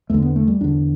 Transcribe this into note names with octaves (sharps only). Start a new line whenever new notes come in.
E2 D3 A3
B3
A3
G3
E2 D3 D4